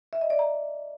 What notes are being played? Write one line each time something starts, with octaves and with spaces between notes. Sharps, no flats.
E5
D#5
D5
A#5